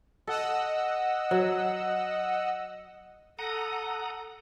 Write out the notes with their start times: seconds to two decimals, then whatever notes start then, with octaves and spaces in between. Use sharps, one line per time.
0.27 A4 D#5 F#5 E6
1.31 F#3
3.39 A4 F#5 A#5 D#6